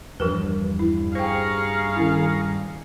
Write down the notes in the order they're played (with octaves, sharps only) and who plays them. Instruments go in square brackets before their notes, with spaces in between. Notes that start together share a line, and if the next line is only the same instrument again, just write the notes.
[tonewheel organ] E2 [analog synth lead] G2 [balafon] F3 A#4 B4
[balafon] E4
[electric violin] G#4 F5 [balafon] C5 G5 [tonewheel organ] A#5 C#6
[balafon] D#3 C#4 E4